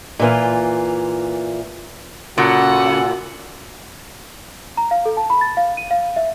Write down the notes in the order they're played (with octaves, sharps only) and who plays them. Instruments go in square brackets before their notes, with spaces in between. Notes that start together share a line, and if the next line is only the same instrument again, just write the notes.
[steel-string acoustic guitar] A#2 E3 F4
[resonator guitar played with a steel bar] A#2 [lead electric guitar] C#3 [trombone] F#4 [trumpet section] A4 F#5
[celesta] A#5
F5
A4
A5
B5
A6
F5
D#7
F5
E5